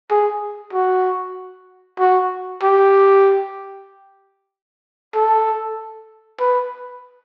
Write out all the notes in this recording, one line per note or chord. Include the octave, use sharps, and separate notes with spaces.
G#4
F#4
F#4
G4
A4
B4